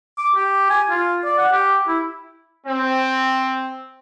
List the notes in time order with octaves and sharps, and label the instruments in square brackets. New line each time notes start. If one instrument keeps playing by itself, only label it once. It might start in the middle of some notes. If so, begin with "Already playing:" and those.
[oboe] D6
G4
G#5
F4
D5
F#5
G4
E4
[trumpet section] C4